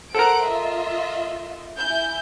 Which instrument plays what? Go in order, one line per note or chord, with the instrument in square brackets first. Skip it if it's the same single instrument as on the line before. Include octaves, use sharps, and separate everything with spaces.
[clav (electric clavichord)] A4 A#4 [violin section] C5 F#5 D7
[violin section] F4 D#5 E5
E4 G#5 G6